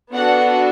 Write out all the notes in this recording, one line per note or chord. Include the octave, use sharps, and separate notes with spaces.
B3 D4 F#4 A4 F#5